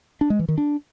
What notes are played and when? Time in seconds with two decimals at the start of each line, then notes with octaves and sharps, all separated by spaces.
0.21 D4
0.30 G#3
0.39 E3
0.48 D#3
0.58 D4